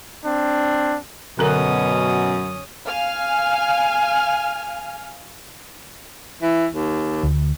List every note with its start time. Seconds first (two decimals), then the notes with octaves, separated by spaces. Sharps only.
0.25 C4 D4
1.39 F#2 B2 D3 C#4 A#4 D#6
2.86 F5 G#5 F6
6.42 E3
6.73 D#2
7.23 D2